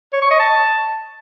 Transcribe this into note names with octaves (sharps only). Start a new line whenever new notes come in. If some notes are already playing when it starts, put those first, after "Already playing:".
C#5
C#6
D#5
A5